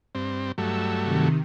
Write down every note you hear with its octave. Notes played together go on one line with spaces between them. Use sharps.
G2 C4
G2 F#3 A3 E6
C3 D#3